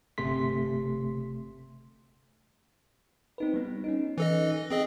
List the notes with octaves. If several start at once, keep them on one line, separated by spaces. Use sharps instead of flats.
G1 C3 A3 C6 B6
C4 D#4 B4
G3 B3
C#4 D#4
E3 A4 D#5
C4 G#4 D#5